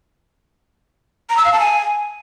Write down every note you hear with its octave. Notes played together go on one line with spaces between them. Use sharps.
A#5
E6
F5
A5
G#5